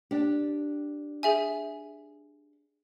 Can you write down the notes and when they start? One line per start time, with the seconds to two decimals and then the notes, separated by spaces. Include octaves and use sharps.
0.11 D4 G4
1.23 G#4 E5 G#5